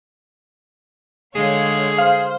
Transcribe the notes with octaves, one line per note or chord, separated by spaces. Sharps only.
D3 G#3 G#4 C#5 F5
C5 F5